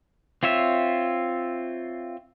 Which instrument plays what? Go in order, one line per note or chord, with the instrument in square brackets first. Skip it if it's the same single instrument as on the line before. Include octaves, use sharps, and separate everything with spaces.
[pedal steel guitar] C4 F4 C#5 E5